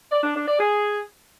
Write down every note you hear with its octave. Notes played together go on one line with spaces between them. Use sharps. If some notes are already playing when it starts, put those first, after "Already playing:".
D5
D4
D4
D5
G#4